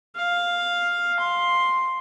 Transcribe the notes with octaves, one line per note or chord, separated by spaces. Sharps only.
F5
C6